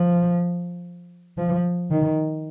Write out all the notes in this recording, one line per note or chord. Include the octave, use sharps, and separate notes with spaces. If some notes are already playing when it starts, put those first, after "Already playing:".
Already playing: F3
F3
D#3